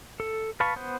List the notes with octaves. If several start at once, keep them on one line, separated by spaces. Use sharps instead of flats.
A4
B4 F5 A5 B5 C#6
B3 C5